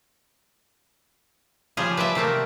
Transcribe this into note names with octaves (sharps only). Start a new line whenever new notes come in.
C#3 F3 G3 G#4
B4 C5 D5 E5
C3 A3 A#3 C4